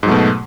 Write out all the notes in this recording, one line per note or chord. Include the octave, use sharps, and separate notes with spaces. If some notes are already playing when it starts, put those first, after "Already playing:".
G#2 B2 F#3 A3